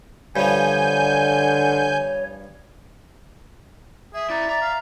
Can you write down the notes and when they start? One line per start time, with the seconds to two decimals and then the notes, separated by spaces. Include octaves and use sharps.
0.36 G2 D3 F3 C#5 G#5 G6
4.14 G#4 E5
4.30 E4 D5 A#5
4.49 D5 A#5
4.62 F5